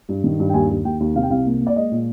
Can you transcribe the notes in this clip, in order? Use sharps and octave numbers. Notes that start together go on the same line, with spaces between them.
G2
D#3
G2
G5
D#2 G#5
D#2
D#2 G5
D#2
C3 F5
G5
C2 F5
A#3
A#3
D5
G#3 D#5
A#2